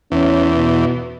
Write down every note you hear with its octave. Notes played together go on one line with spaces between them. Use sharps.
E2 C#4
B2